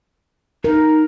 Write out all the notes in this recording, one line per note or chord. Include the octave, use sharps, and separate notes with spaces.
D#4 A#4